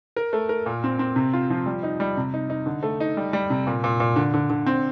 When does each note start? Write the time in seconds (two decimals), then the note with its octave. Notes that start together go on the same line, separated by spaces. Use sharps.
0.16 A#4
0.33 A3
0.49 A#4
0.66 A#2
0.84 C4
0.99 C4
1.16 C3
1.33 F4
1.50 F3
1.66 G3
1.83 D#4
2.00 G3
2.17 C3
2.34 D#4
2.50 D#4
2.66 D3
2.83 A3
3.00 D#4
3.17 G3
3.33 G3
3.50 C3
3.67 A#2
3.84 A#2
4.00 A#2
4.16 D3
4.34 D3
4.50 D3
4.66 C4